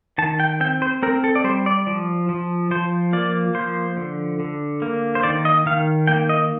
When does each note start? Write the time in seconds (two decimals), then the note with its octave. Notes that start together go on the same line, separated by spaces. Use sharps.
0.18 D#3 A5
0.40 G5
0.60 C4 G5
0.82 C5
1.03 C4 A#4
1.24 A4
1.35 D5
1.44 G3 C5
1.66 D5
1.87 F3
2.29 F3
2.71 F3 C5
3.13 A#3 D5
3.55 F3 C5
3.97 D3
4.40 D3
4.82 A#3
5.15 C5
5.23 D#3 D5
5.45 D#5
5.66 D#3 F5
6.07 A#3 G5
6.29 D#5